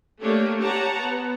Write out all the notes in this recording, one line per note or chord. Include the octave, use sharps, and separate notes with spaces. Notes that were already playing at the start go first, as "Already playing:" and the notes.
A3 A#3 D4 G4 C#5
G4 C#5 F#5 A5 A#5
B3